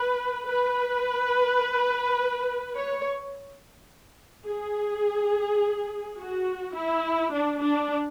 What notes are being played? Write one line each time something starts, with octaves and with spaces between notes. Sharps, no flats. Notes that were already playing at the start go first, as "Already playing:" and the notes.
Already playing: B4
B4
C#5
G#4
F#4
E4
D4
D4